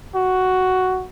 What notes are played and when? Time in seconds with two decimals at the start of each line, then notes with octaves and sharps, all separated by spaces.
0.15 F#4